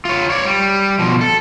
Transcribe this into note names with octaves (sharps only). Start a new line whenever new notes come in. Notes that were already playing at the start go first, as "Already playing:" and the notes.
F4 C#5
C#5 D5
G3
B2 F3
A4